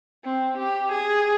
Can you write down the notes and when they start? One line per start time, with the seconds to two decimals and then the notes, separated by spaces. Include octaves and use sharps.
0.25 C4
0.58 G4
0.92 G#4